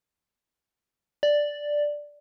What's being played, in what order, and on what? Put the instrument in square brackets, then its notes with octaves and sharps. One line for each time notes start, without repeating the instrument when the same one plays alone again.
[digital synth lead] D5